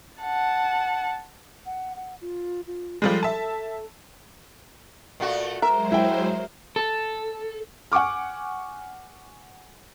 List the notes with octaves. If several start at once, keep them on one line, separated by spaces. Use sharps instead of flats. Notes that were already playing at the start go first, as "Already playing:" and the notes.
F#5 A5
F#5
F#5
F4
F4
F3 G3 G#3 A4
E5 A5
A#2 A3 F#4
F#3 G#3 A#4 C5 E5
E4 G5
A4
F#5 G#5 C#6 D6 F6